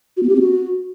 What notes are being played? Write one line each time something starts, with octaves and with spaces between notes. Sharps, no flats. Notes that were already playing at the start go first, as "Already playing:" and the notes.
F#4
B3
G4
C4
F#4